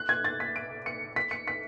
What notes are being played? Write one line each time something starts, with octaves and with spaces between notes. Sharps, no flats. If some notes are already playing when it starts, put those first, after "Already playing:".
Already playing: F#6
G#6
A6
B6
D7
C#7
B6
C#7
B6